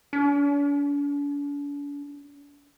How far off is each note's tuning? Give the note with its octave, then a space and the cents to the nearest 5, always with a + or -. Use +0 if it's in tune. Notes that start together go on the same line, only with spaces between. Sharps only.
D4 -45